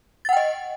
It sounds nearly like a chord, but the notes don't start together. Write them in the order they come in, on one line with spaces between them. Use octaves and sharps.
A6 F#5 G5 D#5